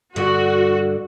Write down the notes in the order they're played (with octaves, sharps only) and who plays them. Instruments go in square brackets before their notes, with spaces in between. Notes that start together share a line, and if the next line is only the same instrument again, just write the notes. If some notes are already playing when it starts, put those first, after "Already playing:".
[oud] G2 D3 [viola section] F#4